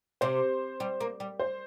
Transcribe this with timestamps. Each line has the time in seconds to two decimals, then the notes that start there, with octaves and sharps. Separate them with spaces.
0.21 C3 C5
0.80 G3
1.01 A#3
1.20 G3
1.39 C5